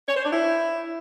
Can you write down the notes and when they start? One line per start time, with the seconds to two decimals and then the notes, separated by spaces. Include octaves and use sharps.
0.09 C#5
0.17 C5
0.25 D4
0.33 E4